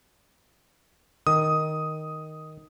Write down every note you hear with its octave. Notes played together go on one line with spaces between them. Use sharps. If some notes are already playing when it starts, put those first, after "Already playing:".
D#3 D#6